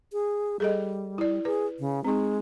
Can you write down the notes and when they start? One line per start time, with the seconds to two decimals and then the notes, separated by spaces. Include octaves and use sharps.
0.13 G#4
0.60 G3 G#4 A4 D#5
1.18 E4 D5
1.45 G#4 B4
1.79 C#3
2.05 G#3 C4 D#4